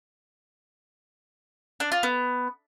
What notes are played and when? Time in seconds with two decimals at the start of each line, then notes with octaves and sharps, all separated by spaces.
1.80 D4
1.92 F4
2.03 B3